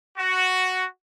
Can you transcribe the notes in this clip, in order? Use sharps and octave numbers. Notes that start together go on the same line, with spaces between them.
F#4